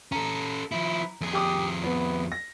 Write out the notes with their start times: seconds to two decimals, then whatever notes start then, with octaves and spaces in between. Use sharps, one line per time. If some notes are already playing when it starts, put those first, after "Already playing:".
0.12 C#4 A4 A#5
0.72 F3 E4
1.21 F2 G#4
1.33 G4 D6 D#6
1.84 B3
2.32 A#6